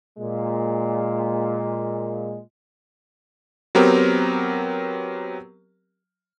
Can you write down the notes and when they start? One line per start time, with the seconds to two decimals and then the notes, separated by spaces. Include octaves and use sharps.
0.17 A#2 G#3
3.75 F#3 B3 C4 G4 A#4